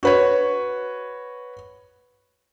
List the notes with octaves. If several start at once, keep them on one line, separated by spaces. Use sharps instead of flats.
F#4 B4 C#5